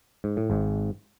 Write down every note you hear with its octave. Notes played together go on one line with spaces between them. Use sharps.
G#2
A2
G#1 G#2